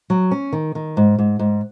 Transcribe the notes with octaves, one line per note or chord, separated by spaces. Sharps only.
F#3
C#4
D#3
D#3
G#2
G#2
G#2